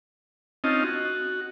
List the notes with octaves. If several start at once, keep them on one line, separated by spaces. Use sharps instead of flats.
C4 C#4 D#4 F4 D#5 A5
F#4